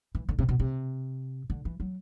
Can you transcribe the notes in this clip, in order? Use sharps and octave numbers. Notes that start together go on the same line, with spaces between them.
E3
D3
C3
B2
C3
D3
E3
F#3